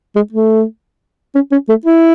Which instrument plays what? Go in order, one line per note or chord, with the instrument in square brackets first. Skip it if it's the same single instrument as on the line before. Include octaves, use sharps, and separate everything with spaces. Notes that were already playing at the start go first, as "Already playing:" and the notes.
[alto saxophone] G#3
A3
C#4
C#4
A3
E4